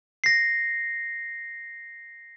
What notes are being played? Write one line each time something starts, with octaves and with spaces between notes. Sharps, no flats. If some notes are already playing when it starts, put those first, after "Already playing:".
A#6 C7